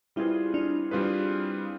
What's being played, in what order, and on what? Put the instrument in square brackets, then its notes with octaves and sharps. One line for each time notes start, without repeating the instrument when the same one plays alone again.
[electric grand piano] G3 C4 F4 G#4 B4 [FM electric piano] E4
[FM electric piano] D4
[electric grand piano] G3 C4 F4 G#4 B4